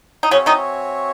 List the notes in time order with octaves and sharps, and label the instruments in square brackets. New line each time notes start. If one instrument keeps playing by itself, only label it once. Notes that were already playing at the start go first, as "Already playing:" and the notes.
[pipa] D#4
[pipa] C#3 C#4 [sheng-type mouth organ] C4 F#4 C#5 E5 G#5
[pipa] D#3 D#4